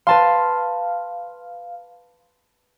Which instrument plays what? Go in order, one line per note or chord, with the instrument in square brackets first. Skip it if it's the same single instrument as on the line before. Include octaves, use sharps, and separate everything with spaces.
[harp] B4 A5 C6 [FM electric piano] F5